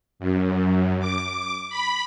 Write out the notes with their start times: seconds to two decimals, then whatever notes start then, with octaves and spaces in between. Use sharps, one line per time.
0.19 F#2
1.00 D6
1.69 B5